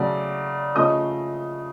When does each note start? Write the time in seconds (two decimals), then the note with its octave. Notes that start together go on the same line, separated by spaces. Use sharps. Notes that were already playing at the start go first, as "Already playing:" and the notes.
Already playing: C#3 F#3 A3 D5
0.75 C#3 F3 A3 C#4 D#5 D#6